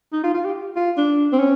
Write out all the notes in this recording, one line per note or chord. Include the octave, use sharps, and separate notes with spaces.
D#4
F4
F4
G4
F4
D4
C4
C#4